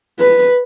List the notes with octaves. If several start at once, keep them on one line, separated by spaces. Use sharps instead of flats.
B4